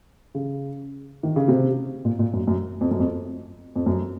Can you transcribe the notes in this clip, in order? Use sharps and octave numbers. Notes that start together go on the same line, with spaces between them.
C#3
D#3
C#3
C3
A#2
A#2
F#2
F#2
F2
F#2
F2
F2
F#2